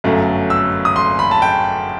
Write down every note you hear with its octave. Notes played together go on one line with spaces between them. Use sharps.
G1 F#2 F#3 A3
E6
D#6
C6
B5
A5
G5